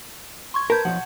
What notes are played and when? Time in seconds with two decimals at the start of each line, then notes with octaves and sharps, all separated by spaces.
0.54 C6 C#6 G#6
0.70 A#4 B4 A5 G6 G#6
0.85 B1 F3 F#5